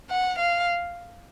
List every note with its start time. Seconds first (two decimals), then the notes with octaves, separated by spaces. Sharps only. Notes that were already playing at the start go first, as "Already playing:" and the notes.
0.10 F#5
0.39 F5